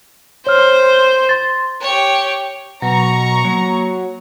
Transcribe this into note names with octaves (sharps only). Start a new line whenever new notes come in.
C5 C#5 F6
C6 A6
G4 C#5
B2 F#3 A#5 C#6
F#3 A#3